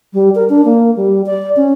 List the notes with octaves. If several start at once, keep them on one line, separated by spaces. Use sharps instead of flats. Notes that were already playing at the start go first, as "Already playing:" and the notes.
G3
A#4
D4
A#3
G3
D5
C#4